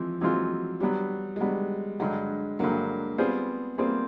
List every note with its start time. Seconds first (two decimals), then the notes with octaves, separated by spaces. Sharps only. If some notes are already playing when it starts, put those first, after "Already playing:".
Already playing: E3 F3 G#3 C4
0.21 E3 F#3 G#3 C4 F4
0.80 F#3 G3 B3 D4
1.36 G#3
1.40 F#3 G3 B3 D4
2.00 G2 D3 F#3 G#3
2.59 G2 D3 F#3 A#3
3.18 G3 B3 C4 F4 G#4 C5
3.78 G3 A#3 C4 F4 G#4 C5